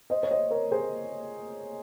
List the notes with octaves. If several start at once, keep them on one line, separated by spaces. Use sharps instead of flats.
C5 D#5
C#5
C5 D#5
A#4 C#5
G#4 C5